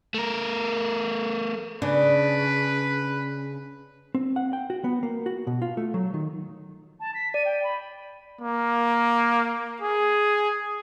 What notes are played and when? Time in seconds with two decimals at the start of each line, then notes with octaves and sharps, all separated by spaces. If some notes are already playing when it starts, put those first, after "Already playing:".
0.14 A3 A#4
1.82 C#3 D4 B4
4.15 C4
4.36 F#5
4.53 G5
4.70 F#4
4.84 B3
5.03 A#3
5.26 F#4
5.47 B2
5.62 F4
5.77 A3
5.94 F#3
6.14 D#3
7.00 A5
7.14 B6
7.34 D5 D#7
7.45 G5
7.64 B5
8.41 A#3
9.82 G#4